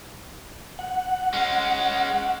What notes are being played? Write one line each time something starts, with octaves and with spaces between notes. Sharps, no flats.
F#5
G#3 C#4